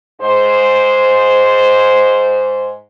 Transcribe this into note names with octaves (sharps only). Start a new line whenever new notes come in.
G#2 C5